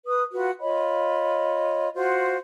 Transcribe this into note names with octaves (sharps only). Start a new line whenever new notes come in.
B4 D#6
F4 F#4 B4
F4 C#5 D#5 B5
F4 F#4 C5